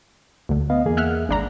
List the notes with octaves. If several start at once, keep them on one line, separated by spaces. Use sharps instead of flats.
D2 D3
B3 D#5 F5
E2 A#3 G#4
E5 F#5 F6
G#1 D4 A#5